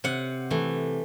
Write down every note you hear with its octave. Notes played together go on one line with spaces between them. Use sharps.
C3 F#5
E3 A3